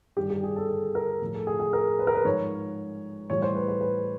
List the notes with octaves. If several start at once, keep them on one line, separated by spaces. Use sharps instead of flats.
G2 D#3 G3 G4
G4
G#4
A4
A4
A#4
A2 F3
A4
G#4
G#4
A#4
B4
A#4
B4
G#2 F3 C#5
A2 E3 G3 C#5
C5
B4
B4
B4